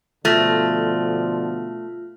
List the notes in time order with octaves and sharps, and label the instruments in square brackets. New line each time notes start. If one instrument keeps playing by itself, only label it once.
[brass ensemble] B2 D3 F3 [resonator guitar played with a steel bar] A3 [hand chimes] F4 F6 A#6